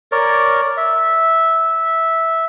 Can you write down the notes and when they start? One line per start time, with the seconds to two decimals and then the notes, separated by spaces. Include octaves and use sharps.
0.12 A#4 C#5 D5
0.77 E5